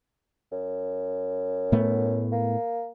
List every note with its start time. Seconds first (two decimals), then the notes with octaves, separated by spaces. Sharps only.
0.52 F#2
1.72 A2 A3 B3
2.32 A#3